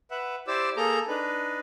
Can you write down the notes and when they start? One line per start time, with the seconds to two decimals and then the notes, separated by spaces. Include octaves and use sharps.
0.11 B4 E5 F#5
0.48 E4 G4 C5 D5 D6 E6
0.77 A#3 G#4 A4 A#5 G6
1.08 D4 D#4 B4